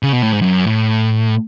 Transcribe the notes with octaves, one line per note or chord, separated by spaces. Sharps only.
C#3
B2
A2
G#2
F#2
A2